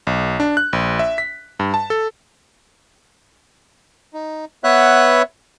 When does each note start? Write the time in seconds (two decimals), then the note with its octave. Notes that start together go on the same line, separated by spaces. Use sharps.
0.07 B1
0.40 D4
0.57 F#6
0.73 A#1
0.99 E5
1.18 B6
1.59 G2
1.74 A5
1.90 A4
4.14 D#4
4.64 B3 B4 C#5 E5 F#5 F#6